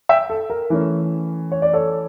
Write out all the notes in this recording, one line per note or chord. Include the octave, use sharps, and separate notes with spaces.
E5 G5
A4
A#4
E3 A3 C#4
C#5
D5
A4 C#5